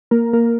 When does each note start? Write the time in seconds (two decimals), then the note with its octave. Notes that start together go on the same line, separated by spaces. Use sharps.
0.11 A#3 A#4
0.33 A#3 A#4